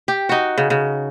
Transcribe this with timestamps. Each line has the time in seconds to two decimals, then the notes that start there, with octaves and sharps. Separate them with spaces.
0.08 G4
0.29 D#4 F#4
0.58 C#3
0.70 C#3